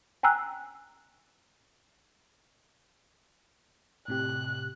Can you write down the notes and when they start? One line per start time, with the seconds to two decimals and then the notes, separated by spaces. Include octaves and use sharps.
0.23 G5 G#5 A#5 E6 F#6
4.08 A2 C3 G4 F#6